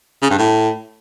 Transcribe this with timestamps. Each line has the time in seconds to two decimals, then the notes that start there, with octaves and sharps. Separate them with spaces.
0.22 C#3
0.30 G2
0.38 A2